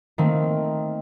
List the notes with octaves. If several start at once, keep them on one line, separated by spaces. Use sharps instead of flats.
D#3 A3 A#3 C4